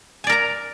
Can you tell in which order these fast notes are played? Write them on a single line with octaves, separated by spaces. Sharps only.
G#5 D5 A#4 A#5